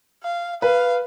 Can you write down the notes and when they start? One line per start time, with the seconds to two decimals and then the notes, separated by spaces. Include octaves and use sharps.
0.23 F5
0.62 B4 F5